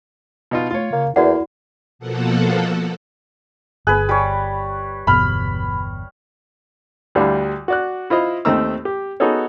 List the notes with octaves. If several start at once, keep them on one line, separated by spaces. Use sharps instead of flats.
B2 D#4 F4
A3 F4 C#5
C#3 A#3
E2 A#3 E4 F#4 D5 F#5
B2 F3 A#3 A4 F#5
G1 G#4 B4 F#6
G3 C#5
G1 E2 B2 B5 F6
D2 G3 D4 E4 F5 A5
F#4 D5 F#6
E4 F4 C5 D#5
D#2 A3 C4 D#4 A#5 E6
G4
B3 D#4 F#4 G#4 A4 C#5